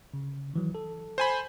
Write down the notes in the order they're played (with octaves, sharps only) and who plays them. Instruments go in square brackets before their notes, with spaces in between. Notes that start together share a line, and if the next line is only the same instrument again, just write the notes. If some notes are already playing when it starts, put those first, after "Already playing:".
[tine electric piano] C#3
D#3 E3 F#3
A4
[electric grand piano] C5 G#5 B5